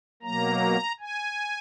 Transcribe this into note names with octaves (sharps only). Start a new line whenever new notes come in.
B2 F#3 A#3 A#5
G#5